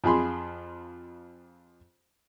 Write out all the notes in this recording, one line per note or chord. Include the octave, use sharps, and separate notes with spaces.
F2 F4 G#4 B5 C6